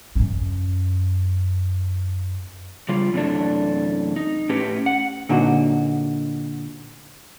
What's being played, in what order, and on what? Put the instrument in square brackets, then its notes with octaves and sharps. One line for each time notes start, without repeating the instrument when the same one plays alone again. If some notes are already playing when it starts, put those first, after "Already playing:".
[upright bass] F#2 C#4
[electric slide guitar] C#3 G3 F4
F#2 C3 E3 A3 D4
D#4
A2 C#4 G4 B4
F#5
[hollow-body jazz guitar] A#2 D3 D#4 F#4